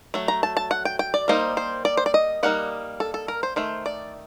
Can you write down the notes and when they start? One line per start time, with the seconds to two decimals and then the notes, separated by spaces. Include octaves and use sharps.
0.14 F#3 A3
0.28 A#5
0.43 A5
0.57 A5
0.71 F#5
0.85 G5
0.99 G5
1.14 D5
1.28 G3 A#3 D#4 C5
1.57 C5
1.85 D5
1.97 C5
2.06 D5
2.14 D#5
2.43 G3 A#3 D#4 F#5
3.00 A4
3.14 A4
3.28 A#4
3.43 C5
3.56 D#3 A3 C5
3.86 D5